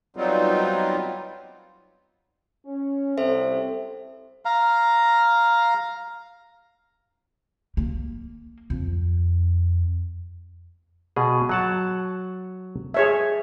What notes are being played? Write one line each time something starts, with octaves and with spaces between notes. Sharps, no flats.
F#3 G3 B3 C4 D#4 F4
C#4
C2 C4 A4 C5 E5
F5 A#5
A#3
F2
B2 G#4
F#3 F#5 A5
G#4 C#5 E5